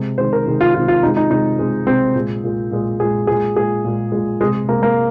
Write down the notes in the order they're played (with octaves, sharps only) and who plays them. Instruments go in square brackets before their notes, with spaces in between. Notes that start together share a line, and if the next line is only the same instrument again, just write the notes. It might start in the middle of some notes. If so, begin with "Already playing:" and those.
Already playing: [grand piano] C3 G#3
C3 D#3 G#3 C5
A#4
C3 D#3 G#3
F4
C3 D#3 G#3 F4
F4
C3 G#3 D#4
D#4
C3 G#3 D#4
C3 G#3
C3 G#3 C4
A#2 G#3
A#2 G#3
A#2 G#3
A#2 G#4
G#3
A#2 G#4
G#3
A#2 G#3 G#4
A#2 G#3
A#2 G#3
C3 G#3
C3 G#3 A#3
A#3